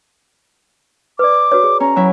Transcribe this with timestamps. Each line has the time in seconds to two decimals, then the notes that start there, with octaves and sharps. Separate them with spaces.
1.19 B4 D5 D6
1.52 F#4 B4 C#5
1.64 G#4
1.80 C#4 A#5
1.96 F#3 E4